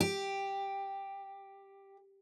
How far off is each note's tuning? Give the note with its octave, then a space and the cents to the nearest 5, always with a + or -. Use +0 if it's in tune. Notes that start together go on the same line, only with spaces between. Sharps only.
G4 +5